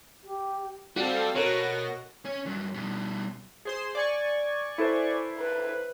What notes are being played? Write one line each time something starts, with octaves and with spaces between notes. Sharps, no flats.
G4
G3 C4 F#4 A4 F5
B2 F#4 A4 A#4 C#5 A#6
C#4
G2 F#3
B2 G3
G#4 C5 C6
D5 G#5 C#6
E4 A4 B4 C5
B4